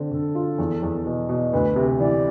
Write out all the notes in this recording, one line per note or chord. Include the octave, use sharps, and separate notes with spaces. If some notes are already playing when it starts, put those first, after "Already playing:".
Already playing: D3 C4
D3 A4
F4
E2
E2
B2
B2
D2 B4
C3
E3 D5